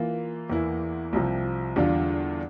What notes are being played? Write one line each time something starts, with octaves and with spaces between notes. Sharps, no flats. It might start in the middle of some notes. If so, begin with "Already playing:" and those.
Already playing: E3 A#3 F4
E2 E3 A#3 E4
C2 C3 F3
E2 D3 G3 D4 F4